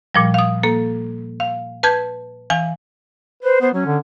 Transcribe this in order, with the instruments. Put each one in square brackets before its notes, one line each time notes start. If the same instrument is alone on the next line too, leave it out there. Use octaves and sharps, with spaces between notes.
[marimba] A#2 F3 G3
F5 D#6
A#3 A4
F5
B4 A5 G6 G#6
E3 F5 G#5
[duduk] B4 [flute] C5
[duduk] B3 [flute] C5
[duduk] F#3 [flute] C#4
[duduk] D3